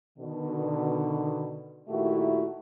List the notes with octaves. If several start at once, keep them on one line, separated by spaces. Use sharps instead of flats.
B2 D3 D#3
A#2 D#3 A3 E4 F#4 G4